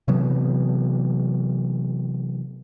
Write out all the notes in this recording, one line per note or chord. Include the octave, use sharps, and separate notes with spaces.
C3 E3 F#3 B3